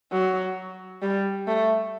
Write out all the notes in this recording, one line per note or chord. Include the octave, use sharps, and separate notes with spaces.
F#3
G3
A3